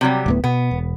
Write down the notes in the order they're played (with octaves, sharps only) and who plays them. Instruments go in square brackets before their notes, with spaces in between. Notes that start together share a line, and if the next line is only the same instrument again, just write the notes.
[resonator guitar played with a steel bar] C3 F#3 G3
[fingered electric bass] D1 A2 B3
[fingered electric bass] B2 [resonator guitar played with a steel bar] B3
[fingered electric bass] E1